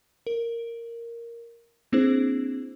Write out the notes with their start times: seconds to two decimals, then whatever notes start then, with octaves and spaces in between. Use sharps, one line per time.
0.27 A#4
1.92 A#3 C4 D4 E4 G#4 C5